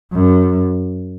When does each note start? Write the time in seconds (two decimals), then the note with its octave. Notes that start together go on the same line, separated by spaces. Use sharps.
0.13 F#2